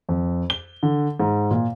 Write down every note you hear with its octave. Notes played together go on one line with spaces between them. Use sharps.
F2
G7
D3
G#2
A#2